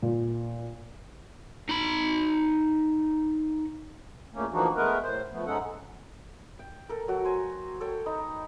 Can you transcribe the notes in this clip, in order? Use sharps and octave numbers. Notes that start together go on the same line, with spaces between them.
A#2
D#4 B5
E2 A#2 A3 A#3 C#4
E3 F3 A#3 D4 D#4 F#4
G#3 A3 B3 A#4 B4
A2 C5
F3 A3 B3
G#2 G#3 C#4 D#4 A4 F#5
G5
A4 A#4
F#3 F#4
C5 G#5
A4 C#5 G5
D#4 B4 A#5